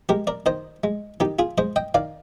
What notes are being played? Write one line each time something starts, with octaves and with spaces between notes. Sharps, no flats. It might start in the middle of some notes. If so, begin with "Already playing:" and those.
G#3 G4 A#4
A#4 D5
D#3 C5 D#5
G#3
D#3 D#4 G4
F4 G#4
G#3 C5 D#5
D#5 G5
D#3 D5 F5